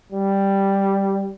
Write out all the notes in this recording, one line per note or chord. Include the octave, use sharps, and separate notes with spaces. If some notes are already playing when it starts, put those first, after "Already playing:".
G3